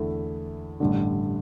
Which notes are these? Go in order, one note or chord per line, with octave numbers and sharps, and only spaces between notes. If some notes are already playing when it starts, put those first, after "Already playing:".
Already playing: E2 D3 A3 E4 A4
A1 G2 D3